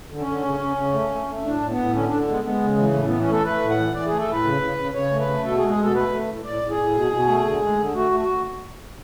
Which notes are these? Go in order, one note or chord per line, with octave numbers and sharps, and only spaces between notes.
D3
C#4
D3
C#3
C#3
C#3
A3
A3
A3
A2 D4
A2
B3
A2
D3 C#4
D3 D4
G#3 B3
G#3 B3
C#3
E3
A2 A3
E3 B3
C#4
A3 A4
A3 B4
A2
F#5
E3
E3 D5
A3 G#4
A4
A2 B4
C#3
C#3
C#3
C#3 C#5
A3
B4
A3
B2 A4
G#4
G#3
G#4
B2 A4
A3 B4
A3
A2
A2 D5
A2
G#4
A2
B2
B2
A3
D3
G#3
D3
A3 F#4
A3
F#4